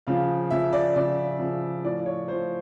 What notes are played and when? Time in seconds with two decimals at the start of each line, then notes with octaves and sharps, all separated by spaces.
0.07 C#3 F3 F5
0.50 C#3 F3 E5
0.73 D5
0.96 C#3 F3 D5
1.39 C#3 F3
1.84 A2 F3 D5
2.06 C#5
2.28 A2 F3 C5